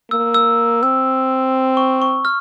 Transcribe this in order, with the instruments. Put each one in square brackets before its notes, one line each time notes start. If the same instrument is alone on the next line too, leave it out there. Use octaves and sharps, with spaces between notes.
[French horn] A#3 [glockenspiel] E6
[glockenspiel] E6
[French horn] C4 [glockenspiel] E6
[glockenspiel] C#6
C#6
F6